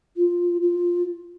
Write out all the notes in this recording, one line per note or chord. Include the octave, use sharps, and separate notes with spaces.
F4
F4